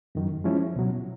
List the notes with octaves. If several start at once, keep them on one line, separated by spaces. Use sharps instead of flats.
F#2 D#3 F#3
F3 G#3 C#4 E4
C#2 B2 F#3